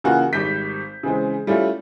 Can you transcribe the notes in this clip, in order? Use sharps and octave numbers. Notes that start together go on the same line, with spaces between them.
C#3 E3 A#3 F4 F#4
G#1 G3 G6 B6
C#3 E3 G#3 C4
G3 A3 C#4 E4 F4